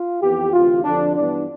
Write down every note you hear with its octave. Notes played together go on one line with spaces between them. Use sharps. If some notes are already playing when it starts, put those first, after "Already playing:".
Already playing: F4
F2 E3 B3 G4
D2 C3 E3 F4
F2 D3 F3 D4
G2 E3 B3 D4